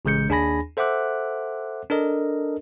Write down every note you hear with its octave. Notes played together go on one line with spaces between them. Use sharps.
A1 C#3 G#3 G6 C#7
D#2 D4 G#4 G#5 B5 A#6
A4 C5 E5 F#5 D6 F#6
D4 A4 A#4 D#5